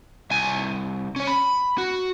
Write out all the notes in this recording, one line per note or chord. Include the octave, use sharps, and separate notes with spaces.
C2 G#5
C#4 C#5
B5
F#4